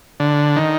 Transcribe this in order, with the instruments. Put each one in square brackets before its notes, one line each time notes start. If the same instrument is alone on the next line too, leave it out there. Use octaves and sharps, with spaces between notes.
[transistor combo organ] D3
D#3